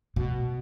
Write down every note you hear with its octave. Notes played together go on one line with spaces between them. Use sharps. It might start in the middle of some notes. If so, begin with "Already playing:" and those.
B2